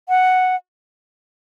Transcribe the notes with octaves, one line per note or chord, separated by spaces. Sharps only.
F#5